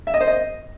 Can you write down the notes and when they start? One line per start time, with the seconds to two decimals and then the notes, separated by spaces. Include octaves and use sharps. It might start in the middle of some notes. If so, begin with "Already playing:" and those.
0.07 E5
0.14 D#5
0.21 C5
0.28 D#5